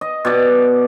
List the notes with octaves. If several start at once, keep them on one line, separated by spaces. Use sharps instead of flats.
D#5
B2 D5 D6